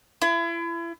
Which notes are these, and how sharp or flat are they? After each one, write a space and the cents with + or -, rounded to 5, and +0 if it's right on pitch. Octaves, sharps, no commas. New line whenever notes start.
E4 +35